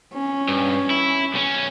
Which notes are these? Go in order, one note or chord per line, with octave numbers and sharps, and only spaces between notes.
C#4
G2
E4
B1 C#4